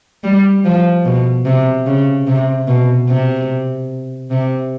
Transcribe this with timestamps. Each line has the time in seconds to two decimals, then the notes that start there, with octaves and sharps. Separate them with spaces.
0.24 G3
0.65 F3
1.05 B2
1.46 C3
1.86 C#3
2.27 C3
2.68 B2
3.09 C3
4.31 C3